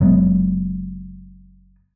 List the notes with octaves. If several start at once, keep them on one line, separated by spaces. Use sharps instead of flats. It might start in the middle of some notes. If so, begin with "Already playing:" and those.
F#1 F#3 G#3 B3